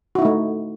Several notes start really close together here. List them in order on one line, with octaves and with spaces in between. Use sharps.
F#4 E4 D#4 A3